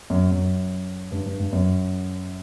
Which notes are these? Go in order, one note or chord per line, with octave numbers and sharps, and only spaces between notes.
F#2
F#2
G2
G2
G2
F#2